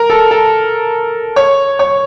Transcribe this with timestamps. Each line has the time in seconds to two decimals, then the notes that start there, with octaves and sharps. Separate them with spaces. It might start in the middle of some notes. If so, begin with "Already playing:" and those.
Already playing: A#4
0.10 A4
0.31 A4
1.36 C#5
1.79 C#5